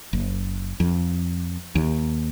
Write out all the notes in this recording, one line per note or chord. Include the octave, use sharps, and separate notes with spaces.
F#1
F2
D#2